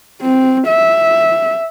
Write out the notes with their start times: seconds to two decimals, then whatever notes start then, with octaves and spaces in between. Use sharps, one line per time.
0.22 C4
0.68 E5